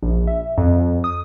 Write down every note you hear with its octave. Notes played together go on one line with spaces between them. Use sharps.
A#1
E5
F2
D#6